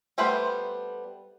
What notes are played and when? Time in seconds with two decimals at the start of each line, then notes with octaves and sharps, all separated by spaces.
0.18 G3 A3 B3 B4 C5